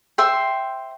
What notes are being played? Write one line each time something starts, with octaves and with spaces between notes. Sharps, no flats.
C5 E5 G5 C6